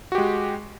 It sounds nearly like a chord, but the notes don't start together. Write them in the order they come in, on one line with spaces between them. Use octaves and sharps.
F#4 G4 G#3